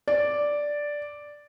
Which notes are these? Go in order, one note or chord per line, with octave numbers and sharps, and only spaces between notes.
D5